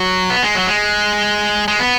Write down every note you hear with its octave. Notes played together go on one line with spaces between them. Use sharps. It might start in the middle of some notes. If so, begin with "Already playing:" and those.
Already playing: F#3
B3
G#3
F#3
G#3
G#3
B3